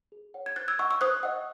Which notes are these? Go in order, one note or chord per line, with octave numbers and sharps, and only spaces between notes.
G#4
C#5 F#5
G#6
C5 F#6 A6
E6 G#6
D#5 F#5 C#6 E6
C#6 E6
C5 D#6 F#6
D#5 F#5